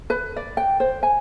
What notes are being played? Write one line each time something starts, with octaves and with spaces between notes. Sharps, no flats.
B4
D5
G5
C5
G#5